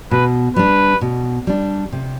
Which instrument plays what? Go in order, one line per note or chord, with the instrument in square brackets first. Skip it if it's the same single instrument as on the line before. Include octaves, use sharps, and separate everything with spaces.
[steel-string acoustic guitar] B2 [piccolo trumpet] B4
[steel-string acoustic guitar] G3 D4 [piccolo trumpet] B4
[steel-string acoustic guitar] B2
G3 D4
C3